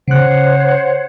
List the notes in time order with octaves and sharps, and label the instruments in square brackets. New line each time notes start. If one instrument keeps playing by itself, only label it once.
[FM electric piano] C#3 F#6 [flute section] C5 C#5 F#5